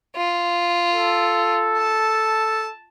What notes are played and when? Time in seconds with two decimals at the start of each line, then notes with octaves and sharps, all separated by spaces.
0.16 F4
0.93 A4
1.78 A5